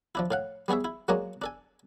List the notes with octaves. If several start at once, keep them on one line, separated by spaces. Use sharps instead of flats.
F3 D4 E4
A2 F5 F#5
G3 B3 G#4 C#5 E5
E4
F#3 G#3 A#3 D4 C#5 D#5
D4 A4 G#5